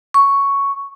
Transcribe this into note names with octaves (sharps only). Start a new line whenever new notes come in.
C#6